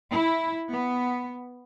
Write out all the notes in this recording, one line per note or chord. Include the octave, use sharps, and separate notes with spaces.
E4
B3